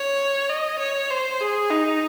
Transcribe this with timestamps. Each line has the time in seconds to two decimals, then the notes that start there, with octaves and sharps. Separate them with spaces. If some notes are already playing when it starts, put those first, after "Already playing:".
Already playing: C#5
0.49 D#5
0.79 C#5
1.10 C5
1.41 G#4
1.70 D#4